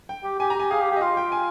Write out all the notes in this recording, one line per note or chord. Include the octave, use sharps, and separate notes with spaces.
G5
G4
G4 G#5
A#5
G4 G#5
G#4 F5
G4
G4 D#5
F4 F5
G5
G#5